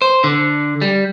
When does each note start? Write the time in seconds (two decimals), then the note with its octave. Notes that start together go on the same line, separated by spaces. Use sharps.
0.02 C5
0.24 D3
0.81 G3